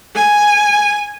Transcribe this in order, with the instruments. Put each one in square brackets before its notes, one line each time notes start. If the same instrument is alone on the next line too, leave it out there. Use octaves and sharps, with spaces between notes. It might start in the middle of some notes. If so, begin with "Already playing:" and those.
[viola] G#5